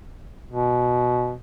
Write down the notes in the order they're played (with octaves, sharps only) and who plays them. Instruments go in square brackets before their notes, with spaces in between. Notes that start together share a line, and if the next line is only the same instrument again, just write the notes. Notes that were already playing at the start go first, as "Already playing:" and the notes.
[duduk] B2